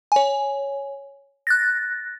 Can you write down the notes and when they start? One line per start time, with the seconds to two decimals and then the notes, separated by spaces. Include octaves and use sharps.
0.12 C#5 G#5
1.47 F#6 A6 A#6